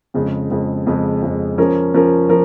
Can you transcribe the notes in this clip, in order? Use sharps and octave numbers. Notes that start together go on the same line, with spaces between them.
F2 C#3 G#3
F2 C#3 G#3
F2 C#3 G#3
F2 C#3 G#3
F3 C#4 A#4
F3 C#4 A#4
F3 A#4